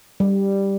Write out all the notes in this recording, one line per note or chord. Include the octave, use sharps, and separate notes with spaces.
G3